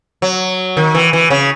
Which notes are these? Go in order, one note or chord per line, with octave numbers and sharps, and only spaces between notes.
F#3
D#3
E3
E3
C#3